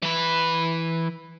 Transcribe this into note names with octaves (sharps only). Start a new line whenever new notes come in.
E3 B4